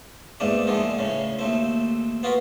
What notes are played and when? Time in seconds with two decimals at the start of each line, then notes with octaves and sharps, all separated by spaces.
0.40 E2 G#2 A3 A#3 D4
0.67 D3 D#3 F3 G#3 A3
0.99 A2 C#3
1.39 D#2 A3 C4
2.23 B3 F4 F#4 A#4 B4